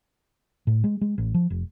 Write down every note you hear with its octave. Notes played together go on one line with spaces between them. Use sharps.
A2
G#3
G#3
A1
F3
F1